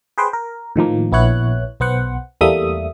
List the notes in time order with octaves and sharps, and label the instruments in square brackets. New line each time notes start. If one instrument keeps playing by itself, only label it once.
[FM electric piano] G#4 B4 C5 G5
A#4
A2 D#3 F3 A#3
A#1 B3 E4 C#5 F#6
B1 B3 C5 F#5
E2 G3 A3 A#3 E5 D#6